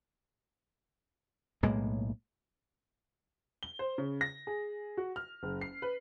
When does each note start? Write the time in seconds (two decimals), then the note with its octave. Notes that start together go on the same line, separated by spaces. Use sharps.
1.63 B1 A2 G#3 A#3
3.63 G7
3.79 C5
3.98 C#3
4.21 A#6
4.47 G#4
4.97 F#4
5.16 F6
5.43 F#1
5.61 C7
5.82 B4